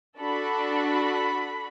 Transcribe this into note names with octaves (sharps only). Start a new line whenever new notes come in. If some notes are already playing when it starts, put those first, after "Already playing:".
D4 F#4 A4 B5